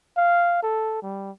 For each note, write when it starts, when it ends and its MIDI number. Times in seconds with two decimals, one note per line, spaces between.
0.17 0.59 77
0.63 1.02 69
1.03 1.31 55